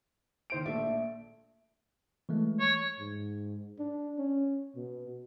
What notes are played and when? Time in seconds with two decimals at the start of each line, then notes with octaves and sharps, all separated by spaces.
0.50 D#3 C5 D7
0.65 A#1 A3 D5 E5
2.29 E3 G#3 A3
2.60 C#5
3.00 G#2
3.79 D4
4.18 C#4
4.76 B2